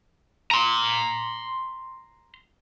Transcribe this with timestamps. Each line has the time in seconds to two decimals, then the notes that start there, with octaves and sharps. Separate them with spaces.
0.51 A#5 C6